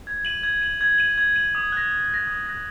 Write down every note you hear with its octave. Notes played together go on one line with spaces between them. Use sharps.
G#6
D#7 F#7
G#6
D#7 F#7
G#6
D#7 F#7
G#6
D#7 F#7
D#6
F#6 A#6
D#6
F#6 A#6
D#6
F#6 A#6